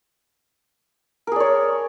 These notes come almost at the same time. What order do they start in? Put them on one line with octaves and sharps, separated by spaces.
A#4 G#4 D5 C#5